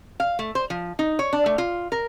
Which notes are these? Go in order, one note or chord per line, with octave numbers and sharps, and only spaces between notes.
F5
A3
C5
F3
D#4
C#5
D4
A3
F4
A#4